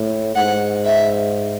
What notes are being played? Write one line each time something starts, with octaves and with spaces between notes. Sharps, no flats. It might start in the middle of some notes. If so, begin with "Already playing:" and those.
Already playing: A2
G#2 F#5
E5